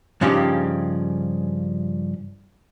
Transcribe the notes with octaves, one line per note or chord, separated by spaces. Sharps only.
G2 C#3 F3 C#4 D#4 G4